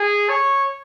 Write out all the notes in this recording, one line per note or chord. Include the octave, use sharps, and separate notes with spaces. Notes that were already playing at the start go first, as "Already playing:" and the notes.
Already playing: G#4
C#5